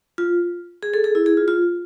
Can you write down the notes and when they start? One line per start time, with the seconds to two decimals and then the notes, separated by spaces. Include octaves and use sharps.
0.18 F4
0.83 G#4
0.94 A4
1.04 G#4
1.15 E4
1.26 G#4
1.37 F4
1.48 F4